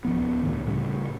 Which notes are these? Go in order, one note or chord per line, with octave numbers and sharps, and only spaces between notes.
D1 D#2 F3 B3
C#2 A2 D#3
A2 C#3 G3